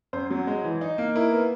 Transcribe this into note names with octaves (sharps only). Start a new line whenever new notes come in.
F#2 C5
F#3
G#3
E3
D#4
A#3
E4 A#4
B3